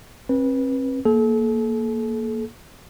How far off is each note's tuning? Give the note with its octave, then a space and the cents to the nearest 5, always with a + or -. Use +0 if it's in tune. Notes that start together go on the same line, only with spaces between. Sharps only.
C4 +40 B4 -20
A#3 +0 A4 -40